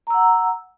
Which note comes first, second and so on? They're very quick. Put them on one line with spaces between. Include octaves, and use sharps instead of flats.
A#5 E6 F#5